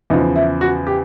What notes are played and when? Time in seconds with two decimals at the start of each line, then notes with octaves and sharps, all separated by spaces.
0.10 E2 C#3 F3 D#4
0.36 E4
0.61 F#4
0.87 G4